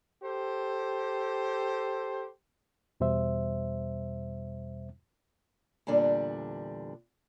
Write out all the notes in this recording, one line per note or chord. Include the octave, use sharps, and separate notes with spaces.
G4 A4 C5
E2 B2 G3 C5 E5
E2 A#2 D3 G3 D4